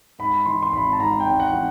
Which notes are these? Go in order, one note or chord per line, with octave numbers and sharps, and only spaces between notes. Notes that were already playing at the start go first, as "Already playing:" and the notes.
G#2 B5
E3 C6
C6
G#1 B5
A5
G#2 A#5
G5
G#1
F#5
E3